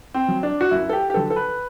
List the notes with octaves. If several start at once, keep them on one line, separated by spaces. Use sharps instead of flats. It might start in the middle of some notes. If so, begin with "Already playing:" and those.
C4
F#3
D4
F#4
F#2 E4
A4
G4
G4
D3 F#3 A4
A4
B4